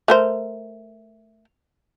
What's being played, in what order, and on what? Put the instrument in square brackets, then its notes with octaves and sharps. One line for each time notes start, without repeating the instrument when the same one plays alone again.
[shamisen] A3 A#4 C5